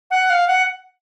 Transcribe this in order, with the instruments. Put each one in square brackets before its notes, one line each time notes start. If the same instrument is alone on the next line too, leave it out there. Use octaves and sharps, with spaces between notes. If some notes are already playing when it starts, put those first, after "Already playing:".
[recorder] F#5
F5
F#5